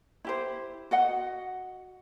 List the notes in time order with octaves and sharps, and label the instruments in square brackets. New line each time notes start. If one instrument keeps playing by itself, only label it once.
[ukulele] E4 G4 C5
F#4 D#5 F#5